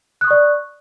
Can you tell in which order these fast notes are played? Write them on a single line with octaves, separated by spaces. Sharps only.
F#6 D#6 C#6 D5